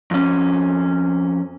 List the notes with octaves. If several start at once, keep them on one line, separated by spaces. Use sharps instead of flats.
F2 C#4